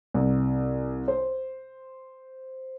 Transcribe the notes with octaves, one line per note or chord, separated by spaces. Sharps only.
C2
C5